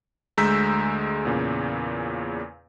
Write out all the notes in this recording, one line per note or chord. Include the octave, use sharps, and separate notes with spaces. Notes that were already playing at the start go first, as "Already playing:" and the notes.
D2 G#3 A#5 E6 G6 B6
E2 A#2 C#3